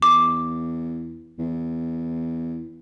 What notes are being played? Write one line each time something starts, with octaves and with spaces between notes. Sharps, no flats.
E2 D6
E2